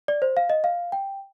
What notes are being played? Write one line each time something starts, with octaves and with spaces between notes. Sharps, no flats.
D5
C5
F5
D#5
F5
G5